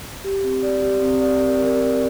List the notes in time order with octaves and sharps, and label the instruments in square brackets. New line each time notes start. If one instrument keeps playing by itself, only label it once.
[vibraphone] G4
C4
D5
G4
C4
D5
A#4
A#4
G4